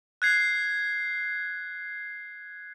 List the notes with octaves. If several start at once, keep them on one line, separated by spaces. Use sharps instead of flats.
F#6 G#6 C7